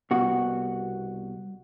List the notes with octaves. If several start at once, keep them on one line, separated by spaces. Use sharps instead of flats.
C2 B2 F#4